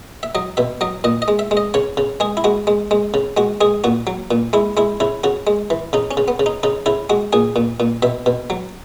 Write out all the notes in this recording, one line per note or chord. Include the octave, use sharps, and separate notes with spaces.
E5
F#3 D#5
B2 E5
F#3 D#5
A#2 D#5
D#5
G#3
E5
G#3
D#5
C#3 C#5
C#3
G#3 G#4
E4
G#3 F#4
G#3
G#3
C#3
G#3 F#4
G#3 G#4
A#2 F#4
F#3
A#2
G#3 E4
G#3 E4
C#3 E4
C#3 F#4
G#3
E3
C#3 D#4
C#4
C#3
B3
C#3
D#4
C#3 D#4
C#3 E4
G#3 F#4
A#2 G#4
A#2
A#2
B2 E5
B2
F#3